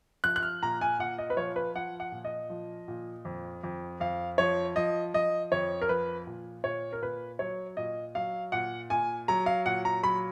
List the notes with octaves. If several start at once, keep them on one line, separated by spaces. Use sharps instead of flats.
F3 F#6
F#6
F6
A#2 A#5
G#5
A#2 F#5
D#5
B4
F3 C#5
B4
F3 F#5
F#5
A#2
D#5
F3
A#2
F2
F2
F2 F5
F3 C#5
F3 D#5
F3 D#5
F2 C#5
A#4
F3 B4
A#2
A#2 C#5
A#4
A#2 B4
F#3 C#5
A#2 D#5
F#3 F5
A#2 F#5
A#2 G#5
F#3 A#5
F5
A#2 F#5
A#5
F#3 B5